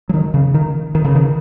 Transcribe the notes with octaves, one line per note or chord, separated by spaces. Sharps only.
F#3
D#3
C#3
D#3
D#3
C#3
D#3